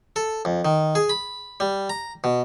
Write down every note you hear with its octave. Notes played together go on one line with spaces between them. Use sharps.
A4
F2
D#3
G#4
B5
G3
A#5
B2